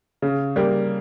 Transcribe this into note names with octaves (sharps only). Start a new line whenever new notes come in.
C#3
G3 A#3